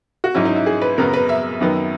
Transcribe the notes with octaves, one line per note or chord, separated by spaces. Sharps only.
F#4
G#2 F#3 C#4 E4
D#4
E4
G#4
B4
F#2 C#3 F#3 B3 A#4
B4
E5
F#2 D#3 F#3 B3